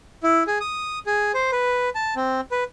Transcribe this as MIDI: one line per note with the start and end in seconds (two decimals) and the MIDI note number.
0.23 0.43 64
0.47 0.58 68
0.60 0.99 87
1.07 1.32 68
1.34 1.51 72
1.52 1.90 71
1.95 2.14 81
2.16 2.41 60
2.51 2.64 71